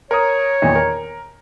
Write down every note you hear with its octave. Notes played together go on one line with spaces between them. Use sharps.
A#4 C#5 D#6
E2 A#2 D#3
A#4